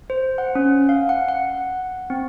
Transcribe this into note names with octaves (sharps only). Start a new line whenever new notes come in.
C5
F#5
C#4
F5
F#5
F#5
C4